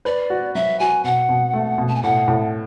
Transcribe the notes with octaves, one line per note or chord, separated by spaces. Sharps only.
B4 D5
F#4
F#3 E5
F#4 G#5
B2 F#5
B2
A3
B2
A5
G#5
A2 F#5
A2